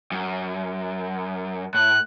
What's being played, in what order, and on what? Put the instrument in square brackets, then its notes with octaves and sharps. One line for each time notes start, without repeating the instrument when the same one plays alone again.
[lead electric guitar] F#2
[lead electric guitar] A2 [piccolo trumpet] F#6